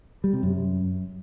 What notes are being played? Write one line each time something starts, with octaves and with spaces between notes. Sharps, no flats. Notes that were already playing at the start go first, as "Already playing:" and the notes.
G3
C3
F#2